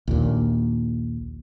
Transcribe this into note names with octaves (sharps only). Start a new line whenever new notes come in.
A#1 D#2 A#2